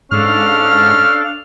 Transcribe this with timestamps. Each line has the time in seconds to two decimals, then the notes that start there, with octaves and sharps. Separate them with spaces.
0.12 G#2 C#4 D4 A4 F5 F6